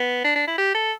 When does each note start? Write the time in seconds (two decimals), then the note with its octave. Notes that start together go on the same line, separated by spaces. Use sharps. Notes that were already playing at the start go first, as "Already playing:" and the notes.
Already playing: B3
0.24 D4
0.36 D4
0.47 E4
0.58 G4
0.75 A4